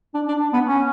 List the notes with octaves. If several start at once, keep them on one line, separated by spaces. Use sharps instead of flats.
D4
D4
B3
C#4